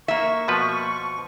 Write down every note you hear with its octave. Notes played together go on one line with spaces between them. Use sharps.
A#3 E5 C#6
B2 F3 B4